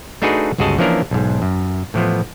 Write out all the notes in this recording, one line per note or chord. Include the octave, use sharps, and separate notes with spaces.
A3 D4 D#4 F#4 G#4 B4
G1 C#2 F#4 G#4 D#5 A5
E3 F3 A#3 C#4 D4 A#4
B1 G#2
F#2
A2 E3 F3 B3